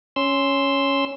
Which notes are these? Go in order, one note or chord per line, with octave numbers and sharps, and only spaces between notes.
C#4 C6 E6